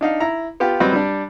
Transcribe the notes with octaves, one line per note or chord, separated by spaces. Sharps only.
D4 D#4 F5
E4 A#5
B3 F4 G4
F#3 G3 C4 B4 D#5
G3 D4